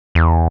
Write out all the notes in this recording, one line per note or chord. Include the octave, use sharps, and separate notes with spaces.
E2